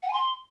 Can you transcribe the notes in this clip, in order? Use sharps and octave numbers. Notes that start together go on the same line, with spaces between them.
F#5
G#5
C6